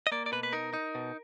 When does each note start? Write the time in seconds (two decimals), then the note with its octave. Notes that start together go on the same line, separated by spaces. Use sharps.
0.07 D#5
0.12 A#3 D5
0.26 D5
0.32 B2 B4
0.43 B4
0.53 D#4 A#4
0.74 D#4
0.95 B2